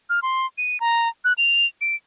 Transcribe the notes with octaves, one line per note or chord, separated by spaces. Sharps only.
F6
C6
D#7
A#5
F#6
F7
D7